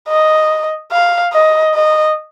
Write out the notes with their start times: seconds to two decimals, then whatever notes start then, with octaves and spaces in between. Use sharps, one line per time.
0.08 D#5
0.92 F5
1.33 D#5
1.74 D#5